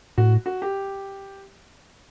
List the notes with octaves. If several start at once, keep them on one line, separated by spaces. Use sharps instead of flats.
A2 F#4
F#4
G4